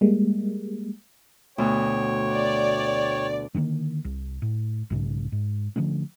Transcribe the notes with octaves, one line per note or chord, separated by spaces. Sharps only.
G3 G#3 A#3
D2 B2 C#5 G5
D5
D3 D#3 G#3 A#3
C2
A2
B1 G#2 C#3
G#2
D3 F3 A3 C#4